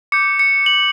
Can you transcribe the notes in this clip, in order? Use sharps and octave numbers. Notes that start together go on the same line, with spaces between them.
D6 G6 C#7
C#7
F#7